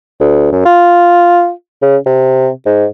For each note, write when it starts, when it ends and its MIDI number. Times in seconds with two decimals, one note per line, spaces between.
0.20 0.50 38
0.52 0.64 42
0.65 1.51 65
1.82 1.96 49
2.06 2.49 48
2.66 2.86 44